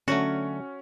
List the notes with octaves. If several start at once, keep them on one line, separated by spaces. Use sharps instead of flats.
D3 F#3 A3 C#4 F#4